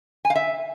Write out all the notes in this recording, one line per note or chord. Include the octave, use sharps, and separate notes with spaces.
G#5
F5
E5